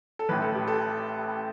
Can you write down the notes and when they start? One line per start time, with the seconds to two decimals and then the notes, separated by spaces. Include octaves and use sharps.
0.19 A4
0.29 A1 A2 E3 B4
0.42 A4
0.55 G4
0.68 A4